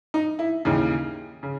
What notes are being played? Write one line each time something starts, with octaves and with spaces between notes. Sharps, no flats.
D#4
E4
D#2 C#3 E3 D#4
C#3